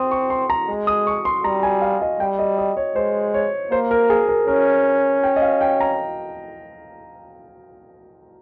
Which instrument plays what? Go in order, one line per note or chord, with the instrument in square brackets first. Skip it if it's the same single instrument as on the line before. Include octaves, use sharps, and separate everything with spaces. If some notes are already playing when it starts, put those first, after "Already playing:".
Already playing: [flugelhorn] C4 [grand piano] C6 D#6
[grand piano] C#6
C6
A#5
[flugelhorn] G#3
[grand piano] D#6
C#6
C6
[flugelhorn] G3 [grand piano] A#5
[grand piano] G#5
F5
D#5
[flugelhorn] G3 [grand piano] G5
[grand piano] D#5
D#5
C#5
[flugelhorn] G#3 [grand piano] C5
[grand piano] C#5
[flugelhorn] A#3 [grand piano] C5
[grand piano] A#4
G#4
A#4
[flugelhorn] C#4 [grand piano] A#4
[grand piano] G5
D#5
F5
G5
A#5